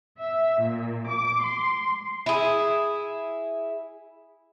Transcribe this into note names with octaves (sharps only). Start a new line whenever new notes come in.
E5
A#2
D6
C6
E4 G#4